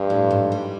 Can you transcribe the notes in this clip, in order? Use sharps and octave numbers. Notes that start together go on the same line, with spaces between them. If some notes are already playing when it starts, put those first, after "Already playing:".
Already playing: G2 F3
A2
G#2
G3